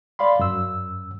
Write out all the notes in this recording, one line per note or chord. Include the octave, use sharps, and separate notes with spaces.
D5 F5 B5 C6
F#2 E6